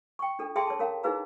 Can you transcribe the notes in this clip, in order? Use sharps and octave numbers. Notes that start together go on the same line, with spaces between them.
G5 C#6
D4 F4 A4
G#4 A4 E5 G5 A5 C6
C#5 A5
C#4 A#4 F5 A#5
D#4 E4 G#4 B4 F5 A#5